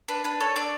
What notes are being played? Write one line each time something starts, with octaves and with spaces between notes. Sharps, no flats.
D4 B4
D4 B4
A4 C#5
D4 D5